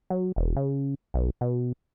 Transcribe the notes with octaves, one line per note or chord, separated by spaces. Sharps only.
F#3
E1
C#3
B1
B2